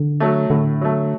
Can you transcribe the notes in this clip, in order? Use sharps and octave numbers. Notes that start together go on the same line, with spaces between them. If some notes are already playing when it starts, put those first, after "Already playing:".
Already playing: D3
F#3 A3
A2 D3
F#3 A3